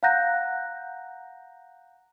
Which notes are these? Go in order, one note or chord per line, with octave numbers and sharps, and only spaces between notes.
F5 F#5 A#5 F#6 G6 A#6